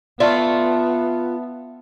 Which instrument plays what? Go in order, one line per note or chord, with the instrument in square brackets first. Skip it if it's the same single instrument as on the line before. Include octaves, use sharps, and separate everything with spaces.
[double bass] B3 [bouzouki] F4 [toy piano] D5 [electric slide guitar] E5 A5